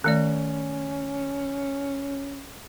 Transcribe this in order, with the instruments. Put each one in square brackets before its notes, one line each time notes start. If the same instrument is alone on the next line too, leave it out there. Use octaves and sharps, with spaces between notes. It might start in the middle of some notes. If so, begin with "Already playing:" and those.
[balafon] D#3 A3 D5 [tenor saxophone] C#4